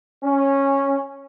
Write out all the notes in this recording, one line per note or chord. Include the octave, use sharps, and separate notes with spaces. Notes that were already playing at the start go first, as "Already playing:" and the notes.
C#4